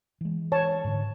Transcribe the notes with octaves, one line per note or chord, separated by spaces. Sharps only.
E3 G#3
C#5 A5
G#2 D3